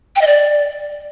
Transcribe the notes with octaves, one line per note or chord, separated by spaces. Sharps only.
G5
D#5
D5